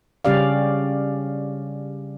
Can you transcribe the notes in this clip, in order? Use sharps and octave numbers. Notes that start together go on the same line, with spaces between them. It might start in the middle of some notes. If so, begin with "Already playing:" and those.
C#3 G3 C#4 G4 D5 F5